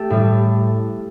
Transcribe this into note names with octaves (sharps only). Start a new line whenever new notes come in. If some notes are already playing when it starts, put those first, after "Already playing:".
Already playing: A3 G4 A4
A2 G3